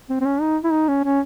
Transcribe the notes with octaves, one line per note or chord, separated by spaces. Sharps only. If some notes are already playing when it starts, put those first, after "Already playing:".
C4
C4
C#4
D#4
E4
D#4
C#4
C#4